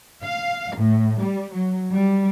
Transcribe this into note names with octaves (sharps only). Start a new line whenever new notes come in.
F5
A2
G3
F#3
G3